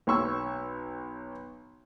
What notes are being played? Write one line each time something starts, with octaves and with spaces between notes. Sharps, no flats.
B1 C#5 C#6 E6